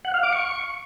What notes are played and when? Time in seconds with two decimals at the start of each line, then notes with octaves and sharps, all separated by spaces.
0.05 F#5
0.14 F5
0.23 D6
0.33 C#6